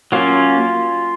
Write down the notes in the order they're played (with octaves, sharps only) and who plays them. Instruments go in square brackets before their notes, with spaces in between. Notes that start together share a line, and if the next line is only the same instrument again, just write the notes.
[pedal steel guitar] F#3 A#3 C#4 F4